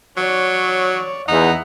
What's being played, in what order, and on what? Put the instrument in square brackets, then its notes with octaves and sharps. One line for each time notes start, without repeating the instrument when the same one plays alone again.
[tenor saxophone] F#3 [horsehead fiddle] C#5 D5
[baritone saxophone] E2 [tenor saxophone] D#4 [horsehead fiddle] E5 F#5